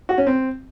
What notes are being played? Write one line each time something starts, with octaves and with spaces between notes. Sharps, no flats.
F#4
C#4
C4